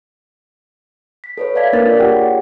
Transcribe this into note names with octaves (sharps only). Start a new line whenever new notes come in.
B6
A4 B4 C#5
D5 E5 F5 A5 G#6 B6
A#3 D4 A#4 A6 B6
F4 D5
F4 G4 G#4 C#5 F#5 G5